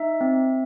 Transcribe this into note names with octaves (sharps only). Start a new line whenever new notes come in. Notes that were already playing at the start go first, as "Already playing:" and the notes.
Already playing: D#4 E5
C4